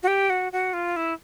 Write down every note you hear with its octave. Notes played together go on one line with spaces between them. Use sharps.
F#4
G4
F#4
F#4
F4
E4